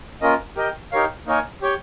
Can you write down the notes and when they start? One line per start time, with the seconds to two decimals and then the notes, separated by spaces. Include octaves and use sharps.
0.22 A#3 C#4 F4 A#4 D#5
0.57 G4 A#4 D#5 G5
0.92 D#4 G4 A#4 C#5 F5
1.27 A#3 D#4 A#4 C#5 G#5
1.62 G4 C#5 G5